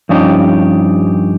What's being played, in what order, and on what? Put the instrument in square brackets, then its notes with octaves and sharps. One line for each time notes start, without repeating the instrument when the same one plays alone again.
[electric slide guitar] G2 F3 C#4 D#4 G4